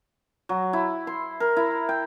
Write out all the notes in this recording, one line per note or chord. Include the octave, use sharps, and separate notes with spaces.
F#3
E4
C6
A#4
E4
G5